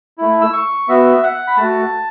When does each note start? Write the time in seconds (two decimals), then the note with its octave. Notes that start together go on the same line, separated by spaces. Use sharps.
0.18 A3 E4
0.41 E6
0.53 C#6
0.88 B3 F#4 E5
1.23 F#5
1.48 B5
1.57 A3 F#4 A5